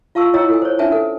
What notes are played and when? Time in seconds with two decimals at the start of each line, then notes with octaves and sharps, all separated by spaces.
0.15 F4 F5 A5 C#6 E6
0.34 E4 C#5 D#5 G5 A#5 E6
0.49 A4 G#5
0.62 C5 C#5
0.79 C#4 D4 B4 E5 G#5 A5
0.92 A4